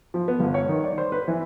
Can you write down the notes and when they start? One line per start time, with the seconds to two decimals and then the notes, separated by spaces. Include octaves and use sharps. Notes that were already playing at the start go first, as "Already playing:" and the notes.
0.14 F3
0.28 B3
0.40 G1
0.54 C#5
0.69 D#3
0.84 D5
0.98 C5
1.12 B4
1.28 E3